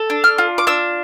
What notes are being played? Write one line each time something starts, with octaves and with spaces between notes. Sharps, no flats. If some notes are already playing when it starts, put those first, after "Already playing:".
Already playing: A4
D4
F6
F4
D6
D4 E6